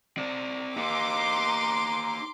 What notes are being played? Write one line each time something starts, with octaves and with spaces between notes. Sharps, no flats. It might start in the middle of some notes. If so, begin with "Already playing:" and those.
C4 D5
D#4 G4 A#5 C6 D6